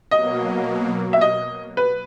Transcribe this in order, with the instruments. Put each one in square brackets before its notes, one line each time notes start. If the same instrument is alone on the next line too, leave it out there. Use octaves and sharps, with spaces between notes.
[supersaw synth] B2 F#3 A#3 [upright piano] D#5
[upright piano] E5
D#5
B4